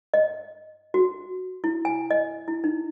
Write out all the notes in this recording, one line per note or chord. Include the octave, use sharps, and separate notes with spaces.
D#5
F#4
E4
G#5
D#5
E4
D#4